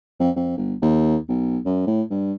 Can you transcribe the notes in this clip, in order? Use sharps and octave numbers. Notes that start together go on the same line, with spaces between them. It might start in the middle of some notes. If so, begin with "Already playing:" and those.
F2
F2
G1
D#2
B1
F#2
A2
G2